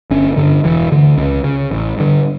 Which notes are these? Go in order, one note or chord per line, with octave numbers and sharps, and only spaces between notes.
G1 C#4
G2 D3
E1 E3
D2 D3
C#2
C#3
A1
G2 D3